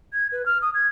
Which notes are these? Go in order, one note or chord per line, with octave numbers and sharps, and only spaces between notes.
G#6
B4
F6
D#6
G#6